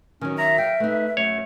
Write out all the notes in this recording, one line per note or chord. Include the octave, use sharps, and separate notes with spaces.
D#3 F#3 C#4
E5 A#5
F5 G5
A3 D#4 B4
F#2 A3 C#5